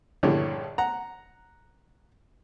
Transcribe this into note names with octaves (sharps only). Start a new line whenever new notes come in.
A#1 G2 D3 E3 C#4 G4
F#5 A#5